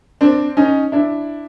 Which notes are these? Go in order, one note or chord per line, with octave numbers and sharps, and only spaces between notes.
C4 D4
C#4 D#4
D4 E4